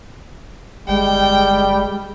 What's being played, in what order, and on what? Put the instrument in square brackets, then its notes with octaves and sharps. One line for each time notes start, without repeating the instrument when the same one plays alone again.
[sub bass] G1 [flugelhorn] G3 [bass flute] G#3 [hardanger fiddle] G5